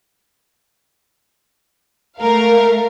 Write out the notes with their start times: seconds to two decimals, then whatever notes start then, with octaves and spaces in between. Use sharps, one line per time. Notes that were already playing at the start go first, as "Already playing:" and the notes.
2.20 A3 A#4 F5